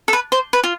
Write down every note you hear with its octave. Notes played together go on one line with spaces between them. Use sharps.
A4
B4
C5
B4
F4